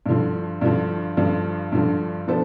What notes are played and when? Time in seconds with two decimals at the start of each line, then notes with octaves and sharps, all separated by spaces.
0.06 G2 D3 F3
0.61 G2 D3 F3
1.17 G2 D3 F3
1.72 G2 D3 F3
2.27 F3 B3 D4 A4 C5